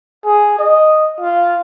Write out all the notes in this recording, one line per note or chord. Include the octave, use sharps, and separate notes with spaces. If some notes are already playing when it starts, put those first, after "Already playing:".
G#4
D#5
F4